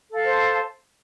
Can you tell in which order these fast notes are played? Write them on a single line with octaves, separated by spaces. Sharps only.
A4 F5 A5 C5